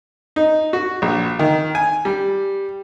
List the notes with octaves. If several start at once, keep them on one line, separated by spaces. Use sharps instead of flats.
D#4
F#4
A#1
D#3
G#5
G3